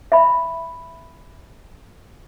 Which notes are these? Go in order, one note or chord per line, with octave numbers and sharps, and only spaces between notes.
E5 B5